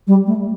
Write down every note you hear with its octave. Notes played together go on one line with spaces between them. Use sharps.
G3
A3